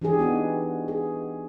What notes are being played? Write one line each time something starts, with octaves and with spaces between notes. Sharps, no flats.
E3 D4 G4 G#4
B3 D#4 F#4
G#4